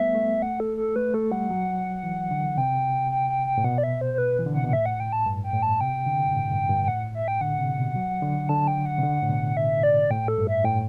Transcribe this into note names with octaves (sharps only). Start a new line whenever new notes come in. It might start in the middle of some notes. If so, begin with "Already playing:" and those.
Already playing: G3 A3 B3 E5
A3
F#5
A4
A4
A3 B4
A3 A4
G3 F#5
F#3
E3
D3
C3 G5
G5
G5
G5
A2
B2 F#5
D5
E5
C5
C5
B4
E3
D3
C3 F#5
B2
F#5
A2 E5
F#5
G5
A5
G2
G5
A2
A5
C3 G5
D3
G2
A2
G2
G2
G5
A2 F#5
E5
G5
D3 F#5
C3
B2
F#3
D3
D3 A5
G5
F#5
C3
D3
A2
B2
E5
D5
A2 G5
A4
G2
E5
A2 G5